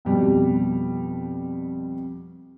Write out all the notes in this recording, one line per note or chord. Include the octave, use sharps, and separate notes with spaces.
F2 B2 G3